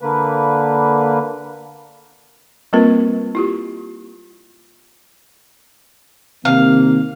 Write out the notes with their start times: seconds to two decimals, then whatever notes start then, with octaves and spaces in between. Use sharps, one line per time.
0.01 D3 A#3 B4
2.73 G3 A#3 C4 F4 A#4 B4
3.35 E4 F4 G4
6.45 C3 D#3 A#3 F5